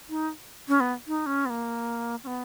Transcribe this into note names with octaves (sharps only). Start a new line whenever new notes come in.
D#4
C#4
B3
D#4
C#4
B3
A#3
C#4
B3